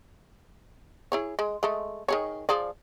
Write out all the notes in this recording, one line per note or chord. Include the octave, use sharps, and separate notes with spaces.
E4 G#4 C#5
G#3
G#3 A3
D#3 G#4 C#5
F3 G#4 D5